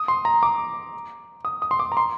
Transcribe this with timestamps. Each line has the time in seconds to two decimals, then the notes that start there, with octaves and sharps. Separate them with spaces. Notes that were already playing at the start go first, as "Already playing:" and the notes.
Already playing: D#6
0.08 C6
0.25 A#5
0.43 D6
1.45 D#6
1.62 D#6
1.71 C6
1.79 D6
1.92 A#5
1.97 C6